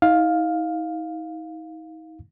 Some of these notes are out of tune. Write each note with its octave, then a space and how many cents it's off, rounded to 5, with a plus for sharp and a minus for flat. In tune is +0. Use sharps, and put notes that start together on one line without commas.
D#4 +40 F5 +10